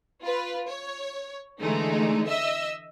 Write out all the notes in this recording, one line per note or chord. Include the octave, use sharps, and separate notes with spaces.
F4 B4
C#5
D3 E3 G#3 A3 D#4
D#5 E5 E6